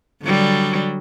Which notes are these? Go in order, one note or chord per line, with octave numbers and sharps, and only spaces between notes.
D3 F#3 G3